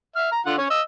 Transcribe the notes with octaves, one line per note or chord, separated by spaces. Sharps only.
E5 F6
A#5
D3 F4 F#5
C#4 C#5
D#5 E6